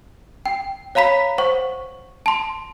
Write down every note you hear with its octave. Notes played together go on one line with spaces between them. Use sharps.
G5
C#5 F5 A#5 B5 B6
C5 F#5 C#6
A5 C6